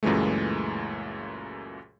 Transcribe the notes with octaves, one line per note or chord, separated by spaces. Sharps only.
C#2 F#2 A#2 E3 G#3 A3